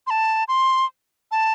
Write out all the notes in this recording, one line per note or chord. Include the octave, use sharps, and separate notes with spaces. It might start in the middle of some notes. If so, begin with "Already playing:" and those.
C6
A5
C6
A5